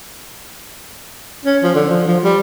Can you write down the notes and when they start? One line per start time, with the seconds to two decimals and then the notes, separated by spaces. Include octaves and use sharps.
1.45 C#4
1.63 F3
1.75 D3
1.90 F3
2.07 F3
2.24 G3